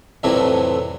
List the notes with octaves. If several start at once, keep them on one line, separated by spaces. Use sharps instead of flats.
C2 F2 A2 C3 E3 F#3